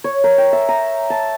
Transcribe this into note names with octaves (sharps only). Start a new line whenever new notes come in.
C#5
A#4
G5
E5
A#5
A5